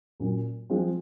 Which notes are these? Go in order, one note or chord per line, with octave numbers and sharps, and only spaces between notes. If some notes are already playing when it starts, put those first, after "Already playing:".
A#2 F#3 C#4
F3 G#3 C4 F4